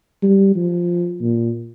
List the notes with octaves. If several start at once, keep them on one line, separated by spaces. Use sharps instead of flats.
G3
F3
A#2